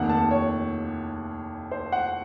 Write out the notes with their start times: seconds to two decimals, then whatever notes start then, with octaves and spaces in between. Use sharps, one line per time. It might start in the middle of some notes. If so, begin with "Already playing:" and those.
Already playing: F1 D#2 D#3 F#5
0.09 A5
0.31 C#5
1.71 C5
1.92 F#5